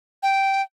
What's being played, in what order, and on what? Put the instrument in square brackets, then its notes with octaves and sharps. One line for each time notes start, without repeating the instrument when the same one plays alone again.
[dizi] G5